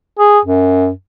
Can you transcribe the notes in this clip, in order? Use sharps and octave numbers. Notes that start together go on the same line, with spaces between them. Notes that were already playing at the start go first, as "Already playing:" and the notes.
G#4
F#2